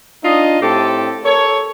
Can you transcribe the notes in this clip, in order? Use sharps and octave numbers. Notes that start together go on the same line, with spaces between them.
D4 D#4 F4 D#5
A2 C4 G4 A4
A4 A#4 C#5